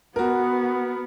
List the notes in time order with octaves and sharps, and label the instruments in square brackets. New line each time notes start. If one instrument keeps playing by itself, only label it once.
[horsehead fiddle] B3 [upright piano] F#4 A#4